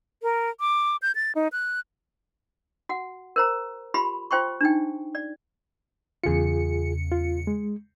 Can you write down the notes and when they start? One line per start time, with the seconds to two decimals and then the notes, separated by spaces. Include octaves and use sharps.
0.23 A#4
0.60 D6
1.02 G6
1.15 A6
1.35 D#4
1.52 F#6
2.89 F#4 F#5
3.36 A#4 C5 A#5
3.94 F4 G4 B5 C6
4.31 F4 C5 G5 C6 C#6
4.61 D4 D#4 G5
5.15 D5
6.24 E2 C#3 F4 G#4 C#7
7.11 F4
7.47 G#3